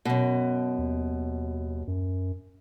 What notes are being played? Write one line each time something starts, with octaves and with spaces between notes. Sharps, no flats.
F#2 B2
D#2
F#2